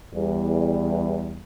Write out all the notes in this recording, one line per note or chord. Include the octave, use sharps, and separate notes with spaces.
E2 G3